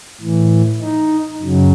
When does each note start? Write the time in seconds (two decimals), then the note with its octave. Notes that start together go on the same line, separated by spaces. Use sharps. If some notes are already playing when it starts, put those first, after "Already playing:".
0.20 A2 E3
0.81 D#4
1.41 F#2 C#3 F#3